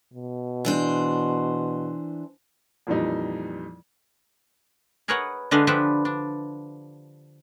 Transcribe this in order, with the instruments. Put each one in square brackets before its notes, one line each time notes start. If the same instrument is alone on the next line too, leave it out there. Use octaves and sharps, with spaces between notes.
[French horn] B2
[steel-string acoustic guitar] E3 D4 C5
[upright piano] F2 A#2 E3 G3 D#4
[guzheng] G#4 A#4 B4 C#5 D#5 F#5
D3 G#3 D4 B4 D#5 F5
F3 D4 G4 B4 E5
D4